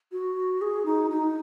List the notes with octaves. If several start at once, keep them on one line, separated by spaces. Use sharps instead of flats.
F#4
G#4
D#4
D#4